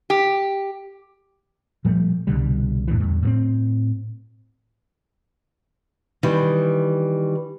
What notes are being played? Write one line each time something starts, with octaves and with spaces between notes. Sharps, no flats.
G4
A#2 F3 G3 A3
C2 B2 D3 G3
F2 A2 D3 E3
E2 G2
A2 A#3 C4
D#3 E3 G3